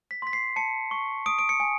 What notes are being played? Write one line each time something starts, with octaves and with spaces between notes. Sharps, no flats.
B6
C6 B6
C7
A5 C#7
C#6
D#6 D7
D7
C#7
G#5